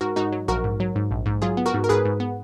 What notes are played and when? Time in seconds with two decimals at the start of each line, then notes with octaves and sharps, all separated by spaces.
0.01 G#2 F#4 A#4
0.16 G#2 D#4 F#4
0.32 F#3
0.48 A#1 F#4 A#4
0.64 G#2
0.80 F#3
0.96 G#2
1.11 A#1
1.26 G#2
1.42 F#3 F4 G#4
1.57 B3
1.66 F#4 A#4
1.74 G#2
1.84 A#4
1.89 G#2 G#4 B4
2.05 G#2
2.20 B3